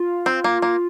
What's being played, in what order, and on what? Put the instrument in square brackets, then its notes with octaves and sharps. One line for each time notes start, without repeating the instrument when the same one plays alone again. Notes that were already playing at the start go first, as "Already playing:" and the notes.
Already playing: [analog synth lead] F4
[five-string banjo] C4
A#3
A#3